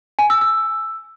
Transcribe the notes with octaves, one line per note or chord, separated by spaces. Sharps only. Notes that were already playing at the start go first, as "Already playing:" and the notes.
G#5
E6
E6